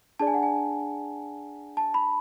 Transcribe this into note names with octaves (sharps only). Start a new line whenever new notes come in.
D4 G#4 D5 A5
G#5
F#5
G#5
A5
B5